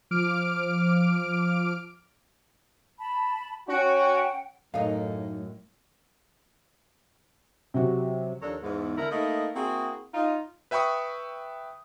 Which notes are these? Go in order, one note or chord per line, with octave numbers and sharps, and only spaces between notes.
F3 D6 F6 D7
A5 B5
C#4 F#4 F#5 G5
F#2 A2 A3 D#4 D#5 F5
C3 F#3 F#4
D#2 F3 D4 A4 A#4 C#5
E2 G#2
D3 E4 A#4
A3 A#3 D#4 E4 D#5
A#3 C4 E4 F#4 G#4
D#4 F4
B4 E5 G5 B5 C#6 D#6